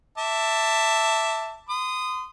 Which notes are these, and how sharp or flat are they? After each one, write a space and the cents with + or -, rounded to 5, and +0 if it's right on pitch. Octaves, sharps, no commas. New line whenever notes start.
E5 +0 A5 +15 D6 -15
C6 -35 D#6 -10